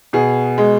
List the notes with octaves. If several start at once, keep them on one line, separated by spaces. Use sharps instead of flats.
B2 G#4
G#3